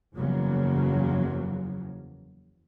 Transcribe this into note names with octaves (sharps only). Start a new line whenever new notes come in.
F#1 E2 C#3 F3 F#3 A#3